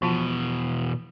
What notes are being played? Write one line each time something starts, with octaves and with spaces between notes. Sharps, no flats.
E2 B2 F3 F4 A5